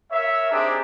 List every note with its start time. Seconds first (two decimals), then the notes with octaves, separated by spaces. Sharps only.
0.11 A#4 C#5 E5
0.51 C4 D4 D#4 G4 G#4